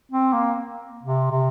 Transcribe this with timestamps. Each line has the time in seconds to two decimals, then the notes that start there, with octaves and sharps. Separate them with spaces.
0.12 C4
0.33 A#3
1.03 C3
1.31 C3